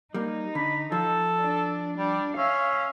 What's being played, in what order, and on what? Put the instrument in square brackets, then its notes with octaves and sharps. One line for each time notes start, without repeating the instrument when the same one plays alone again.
[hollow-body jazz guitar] G3 A#3 [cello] D#4
[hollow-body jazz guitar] D3 [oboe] B5
[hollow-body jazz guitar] F3 [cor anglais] A4 [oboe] A5
[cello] D4
[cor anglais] G3 [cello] D4
[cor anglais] C#4 [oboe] E5 [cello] F5